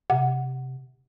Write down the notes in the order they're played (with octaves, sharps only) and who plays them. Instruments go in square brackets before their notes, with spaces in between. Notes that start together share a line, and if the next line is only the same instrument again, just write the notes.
[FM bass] C3 [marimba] F#5